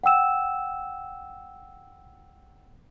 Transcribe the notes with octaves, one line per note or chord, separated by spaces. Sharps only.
F#5 G5 E6 E7